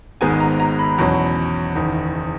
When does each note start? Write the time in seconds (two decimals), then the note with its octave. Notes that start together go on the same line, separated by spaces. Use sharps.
0.21 G#1 G#2 D#3 G#3 B3 G#5
0.40 A#5
0.60 A#5
0.79 B5
0.98 E2 B2 F#3 C#4
1.75 F#1 E2 D#3